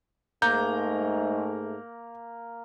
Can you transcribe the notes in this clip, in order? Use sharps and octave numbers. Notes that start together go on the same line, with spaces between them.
G#2 A3 A#3 A#5 G6